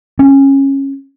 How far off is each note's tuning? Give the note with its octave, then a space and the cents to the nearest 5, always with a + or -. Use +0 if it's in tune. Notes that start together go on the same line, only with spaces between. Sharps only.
C#4 -20